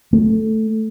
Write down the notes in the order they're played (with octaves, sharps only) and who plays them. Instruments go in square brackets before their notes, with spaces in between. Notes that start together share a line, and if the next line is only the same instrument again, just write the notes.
[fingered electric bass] A3